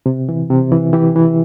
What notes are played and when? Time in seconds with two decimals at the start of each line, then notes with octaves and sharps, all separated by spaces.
0.06 C3
0.29 E3
0.51 C3
0.72 E3
0.93 E3 E4 G4
1.16 E3